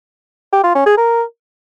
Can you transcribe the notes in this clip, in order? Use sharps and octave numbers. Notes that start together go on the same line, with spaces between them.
G4
F4
C#4
G#4
A#4